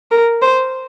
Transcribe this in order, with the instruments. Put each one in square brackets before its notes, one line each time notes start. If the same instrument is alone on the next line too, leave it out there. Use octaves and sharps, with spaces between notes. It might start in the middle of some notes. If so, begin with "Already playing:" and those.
[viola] A#4
C5